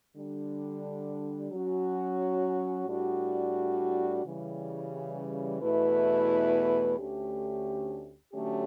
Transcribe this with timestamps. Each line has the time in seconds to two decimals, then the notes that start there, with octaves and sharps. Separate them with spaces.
0.15 D3 G3 D4
1.51 F#3 C#4 F#4
2.87 A2 G3 D4 F#4
4.24 C#3 E3 G3
5.60 E2 B2 A3 E4 B4
6.97 D2 D3 A3 C#4 G4
8.34 D3 F#3 A3 C#4 G4